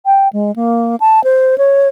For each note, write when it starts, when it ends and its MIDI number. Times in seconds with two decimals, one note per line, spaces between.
0.06 0.28 79
0.33 0.54 56
0.56 0.96 58
1.00 1.23 81
1.24 1.58 72
1.58 1.88 73